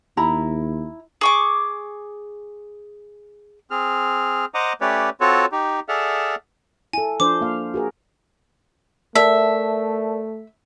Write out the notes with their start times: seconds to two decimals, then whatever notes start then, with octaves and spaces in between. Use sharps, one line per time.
0.17 D#2 E4 A#5 B5
1.21 G#4 C#6 D6
3.71 C4 G#4 F6
4.54 C5 D#5 F#5 A#5 D6 D#6
4.81 A3 C#4 G4 B4 C#5 D5
5.20 C4 F4 F#4 A4 C#5
5.52 D#4 G4
5.89 G#4 A4 D5 E5 F#5 F6
6.93 E4 A4 G#5
7.20 F3 D4 C5 D6
7.41 A#3 F5
7.74 F#4 G#4 A#4
9.15 A3 A#4 D5 E5 A5